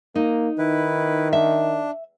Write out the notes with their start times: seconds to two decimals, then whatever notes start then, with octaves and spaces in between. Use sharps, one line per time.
0.15 A#3 D#4
0.58 D#3 E4 B4
1.33 D4 E5